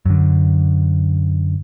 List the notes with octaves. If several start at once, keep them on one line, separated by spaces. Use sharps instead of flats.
F#2 D3